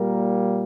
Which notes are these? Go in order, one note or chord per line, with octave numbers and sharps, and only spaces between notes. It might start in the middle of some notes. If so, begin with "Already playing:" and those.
Already playing: A#2 G3 A#3 A#4